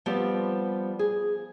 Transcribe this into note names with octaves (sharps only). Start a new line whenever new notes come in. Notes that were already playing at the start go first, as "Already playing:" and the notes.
F3 G3 B3 C4 F4 G4
G#4